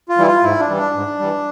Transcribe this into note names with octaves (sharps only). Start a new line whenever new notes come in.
F4
E3 G3 E4
F4
G#2 E4
D4
E3 G3
D4
G#2
E3 G3